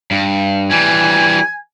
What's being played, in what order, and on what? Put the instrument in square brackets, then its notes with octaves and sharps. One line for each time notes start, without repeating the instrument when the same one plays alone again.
[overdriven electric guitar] G2
[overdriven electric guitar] E3 G3 [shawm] G#5